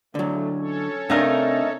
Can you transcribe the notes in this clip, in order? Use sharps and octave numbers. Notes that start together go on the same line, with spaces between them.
D3 F#3 A3
C#4 A4 C#5
C3 A3 D4 D#4 A#4 F5 G#5